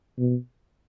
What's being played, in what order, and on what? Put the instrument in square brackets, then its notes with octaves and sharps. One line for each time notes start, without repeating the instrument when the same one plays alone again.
[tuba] B2